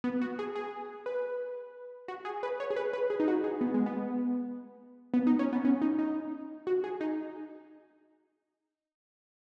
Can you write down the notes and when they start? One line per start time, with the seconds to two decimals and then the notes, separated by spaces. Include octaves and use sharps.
0.04 B3
0.22 F#4
0.39 G#4
0.55 G#4
1.06 B4
2.08 F#4
2.25 G#4
2.43 B4
2.60 C#5
2.70 G#4
2.76 B4
2.93 B4
3.10 G#4
3.20 D#4
3.28 F#4
3.44 G#4
3.61 B3
3.74 G#3
3.86 B3
5.14 B3
5.27 D#4
5.39 C#4
5.53 B3
5.65 C#4
5.82 D#4
5.99 D#4
6.67 F#4
6.84 G#4
7.01 D#4